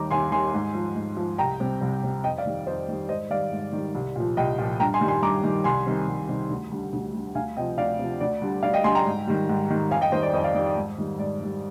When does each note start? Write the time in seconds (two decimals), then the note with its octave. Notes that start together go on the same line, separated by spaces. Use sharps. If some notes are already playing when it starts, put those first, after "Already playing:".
Already playing: D#2 D#3 G3 A#5 D6
0.11 D#2 G#5 C6
0.32 D#3 G3 G#5 C6
0.54 G#2
0.75 F3
0.96 G#2
1.17 F3
1.38 C2 G5 A#5
1.60 C3 G3
1.81 C2
2.03 C3 G3
2.24 F2 D#5 G5
2.38 D5 F5
2.46 D#3 G3
2.66 F2 C5 D#5
2.88 D#3 G3
3.09 G#2 C5 D#5
3.30 D#3 G3 D5 F5
3.52 G#2
3.73 D#3 G3
3.95 C2
4.16 A#2 F3
4.37 C2 D#5 G5
4.58 A#2 F3
4.80 G2 G5 A#5
4.94 G#5 C6
5.01 D#3 G3
5.08 G#5 C6
5.22 G2 A#5 D6
5.44 D#3 G3
5.64 C2 G#5 C6
5.86 C3 D#3 G3
6.08 C2
6.29 C3 D#3 G3
6.50 D2
6.71 D3 G3
6.93 D2
7.14 D3 G3
7.35 D2 F5 G#5
7.57 C3 F3 D#5 G5
7.78 D2 D5 F5
7.99 C3 F3
8.20 D2 D5
8.42 D3 G3
8.63 D2 D5 F5
8.74 D#5 G5
8.84 D3 G3 G#5 C6
8.95 G5 A#5
9.06 G#2
9.27 D#3 G3
9.49 G#2
9.70 D#3 G3
9.90 F2 F5 G#5
10.01 D#5 G5
10.12 D#3 G3 C5 D#5
10.23 D5
10.33 F2 C5 D#5
10.44 D5 F5
10.54 D#3 D5
10.58 G3
10.66 D5
10.77 G#2
10.98 D#3 G3
11.18 G#2 D5
11.40 D#3 G3